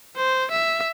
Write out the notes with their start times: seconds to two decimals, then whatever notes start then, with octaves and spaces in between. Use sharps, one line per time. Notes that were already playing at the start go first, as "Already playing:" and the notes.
0.17 C5
0.51 E5